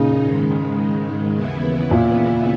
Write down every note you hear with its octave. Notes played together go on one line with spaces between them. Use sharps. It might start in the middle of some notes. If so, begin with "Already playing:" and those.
Already playing: A#2 C#3 D#4
G#2 D#3 G#3
D#2 C#3 E3 B3 E4
A#2